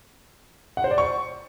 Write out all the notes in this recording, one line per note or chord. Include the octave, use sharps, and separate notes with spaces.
F#5
C5
D5
C#6